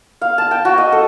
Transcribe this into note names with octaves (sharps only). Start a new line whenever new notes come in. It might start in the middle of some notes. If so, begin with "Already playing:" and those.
F5
A5
G5
F#4
D#5
A4